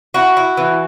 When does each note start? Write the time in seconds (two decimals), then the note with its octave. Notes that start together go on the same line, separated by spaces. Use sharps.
0.14 E4 F#4
0.37 E4
0.57 E3